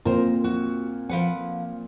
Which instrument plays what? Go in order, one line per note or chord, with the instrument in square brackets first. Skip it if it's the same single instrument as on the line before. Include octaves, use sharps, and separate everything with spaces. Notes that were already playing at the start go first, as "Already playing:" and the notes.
[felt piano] A#2 C4 F4 [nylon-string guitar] A#4 C5
[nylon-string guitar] F#4
F3 B4 F#5